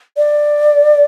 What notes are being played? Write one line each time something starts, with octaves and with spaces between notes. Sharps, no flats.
D5